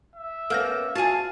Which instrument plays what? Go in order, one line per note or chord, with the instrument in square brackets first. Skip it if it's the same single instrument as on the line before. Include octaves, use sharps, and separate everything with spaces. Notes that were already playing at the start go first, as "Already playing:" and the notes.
[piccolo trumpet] E5
[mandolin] A#3 [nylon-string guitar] B3 C#4 [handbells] A4 G6 A#6
[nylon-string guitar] F4 [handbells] F#4 G#5 [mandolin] G#4 A5 [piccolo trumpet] F5